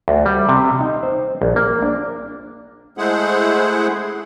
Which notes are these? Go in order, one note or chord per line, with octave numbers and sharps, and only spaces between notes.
D2
G3
C3
D#4
C5
A#1
A#3
D4
G#3 A3 E4 G#4 C5 F#5